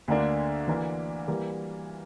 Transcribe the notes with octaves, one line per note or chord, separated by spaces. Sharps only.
D2 D3 A#3 D4
E3 A#3 D4
E3 G3 A#3